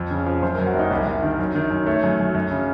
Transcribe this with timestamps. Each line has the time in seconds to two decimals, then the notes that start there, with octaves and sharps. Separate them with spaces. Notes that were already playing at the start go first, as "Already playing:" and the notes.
Already playing: F2
0.11 C#3
0.26 F3
0.42 F#1 C5
0.55 A#4
0.58 F#2
0.67 F#4
0.74 F#1 D#4
0.91 C2
1.06 C2
1.23 D#3
1.39 F#2
1.55 D#3
1.71 F#2
1.86 A3 C#5
2.04 F#2
2.20 F#2
2.35 F#2
2.51 C#3